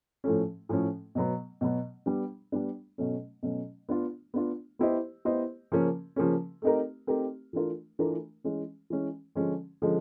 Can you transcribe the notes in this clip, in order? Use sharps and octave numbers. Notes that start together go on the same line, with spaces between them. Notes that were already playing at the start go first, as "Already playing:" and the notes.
A2 F3 A3 C#4
A2 F3 A3 C#4
B2 F#3 B3
B2 F#3 B3
G3 B3 D4
G3 B3 D4
B2 F#3 A3 C#4
B2 F#3 A3 C#4
B3 D4 F4
B3 D4 F4
B3 E4 G4 C5 D#5
B3 E4 G4 C5 D#5
C#3 F3 A#3 C#4
C#3 F3 A#3 C#4
A3 C4 D#4 G4 A#4
A3 C4 D#4 G4 A#4
E3 A3 D4 F4 A#4
E3 A3 D4 F4 A#4
E3 G#3 C#4
E3 G#3 C#4
D3 F3 G#3 C#4
D3 F3 G#3 C#4